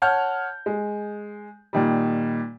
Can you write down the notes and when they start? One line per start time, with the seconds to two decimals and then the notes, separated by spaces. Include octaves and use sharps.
0.02 C#5 F#5 A5 F6 G6
0.66 G#3
1.73 A#2 D#3 G3